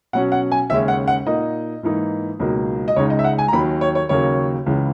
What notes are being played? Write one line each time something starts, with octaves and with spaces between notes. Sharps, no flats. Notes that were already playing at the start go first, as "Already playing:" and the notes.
B2 F#3 C#4 F#5
F#5
G#5
D#2 C#3 G#3 C#4 E5
F#5
F#5
A#2 A#3 D#4 D#5
G#2 E3 A#3 D#4
C#2 B2 F#3 A#3 D#4
D#5
C#2 C#3 G#3 D#4 C#5
D#5
E5
F#5
G#5
A#5
D#2 D#3 F#3 B5
C#5
C#5
D#2 C#3 F#3 A#3 C#5
C#2 C#3 E3